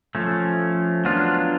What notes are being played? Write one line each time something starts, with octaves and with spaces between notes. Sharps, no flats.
F3 A3 C#4
F#3 B3 D4 F4